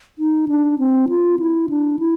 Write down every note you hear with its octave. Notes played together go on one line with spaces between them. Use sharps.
D#4
D4
C4
F4
E4
D4
E4